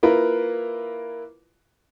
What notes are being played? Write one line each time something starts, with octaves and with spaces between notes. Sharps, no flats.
A#3 E4 F4 A#4 B4